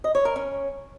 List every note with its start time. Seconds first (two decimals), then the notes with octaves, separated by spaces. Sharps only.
0.04 D#5
0.15 C#5
0.25 A#4
0.36 C#4